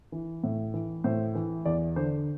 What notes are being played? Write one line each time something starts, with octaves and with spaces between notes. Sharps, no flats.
E3
A2
E3
A2 C5
E3
E2 D5
D3 C5